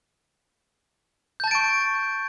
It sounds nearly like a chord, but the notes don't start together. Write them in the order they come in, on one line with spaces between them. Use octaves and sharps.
G6 A5 A6 D7 C#6